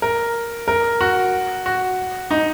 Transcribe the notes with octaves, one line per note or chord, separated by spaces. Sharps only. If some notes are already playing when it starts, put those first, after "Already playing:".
A#4
A#4
F#4
F#4
D#4